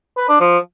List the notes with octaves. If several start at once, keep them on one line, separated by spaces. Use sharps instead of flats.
B4
D4
F3